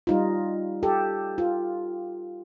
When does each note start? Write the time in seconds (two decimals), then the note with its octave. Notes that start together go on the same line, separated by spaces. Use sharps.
0.07 G3 D#4 F4
0.83 G4 A4
1.38 F4